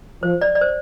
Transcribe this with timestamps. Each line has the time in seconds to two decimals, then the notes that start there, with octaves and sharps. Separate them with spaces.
0.23 F3 C5
0.41 D5
0.55 D5
0.61 C5